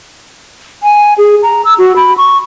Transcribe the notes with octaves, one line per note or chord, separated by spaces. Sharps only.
G#5
G#4
A#5
E6
F#4
B5
C#6